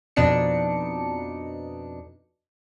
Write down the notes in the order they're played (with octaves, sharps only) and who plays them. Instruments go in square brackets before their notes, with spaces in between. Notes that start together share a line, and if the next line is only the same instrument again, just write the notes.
[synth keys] F2 B2 D4 D#4 C#7